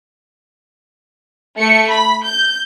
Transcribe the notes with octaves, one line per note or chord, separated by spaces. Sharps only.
A3 C#7
B5
G6